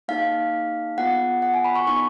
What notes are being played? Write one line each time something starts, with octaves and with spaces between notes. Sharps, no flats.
A#3 D#4 G#4 F5
B3 F4 G#4 F#5
F#5
G#5
B5
C#6
B3 D#4 G#4 C#6